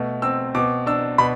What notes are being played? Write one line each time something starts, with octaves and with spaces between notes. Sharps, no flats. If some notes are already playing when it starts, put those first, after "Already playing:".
Already playing: B2 A3
C4 E6
B2 D6
D4 E6
B2 B5